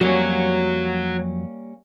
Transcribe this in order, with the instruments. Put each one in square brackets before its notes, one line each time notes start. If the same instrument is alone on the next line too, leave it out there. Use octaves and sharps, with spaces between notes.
[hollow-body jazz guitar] F2 F#3 [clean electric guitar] G3 A#3 C#4 [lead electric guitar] F#4 C#5